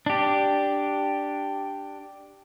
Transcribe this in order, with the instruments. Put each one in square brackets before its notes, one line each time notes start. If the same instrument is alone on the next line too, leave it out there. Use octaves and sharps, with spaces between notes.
[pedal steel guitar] D4 G4